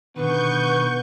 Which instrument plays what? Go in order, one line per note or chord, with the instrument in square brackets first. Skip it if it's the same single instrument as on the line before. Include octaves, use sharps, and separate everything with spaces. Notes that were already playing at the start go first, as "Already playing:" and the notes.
[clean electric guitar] B2 D3 D#3 [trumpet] B3 [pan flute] B4 [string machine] C#6 G6